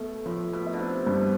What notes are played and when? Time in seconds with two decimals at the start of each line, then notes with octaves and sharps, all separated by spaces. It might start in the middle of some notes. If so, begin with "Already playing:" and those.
Already playing: B2 A3
0.26 A2 F3
0.53 B2
0.67 E4
0.73 D3
0.79 C3
1.06 G2 B2
1.21 B2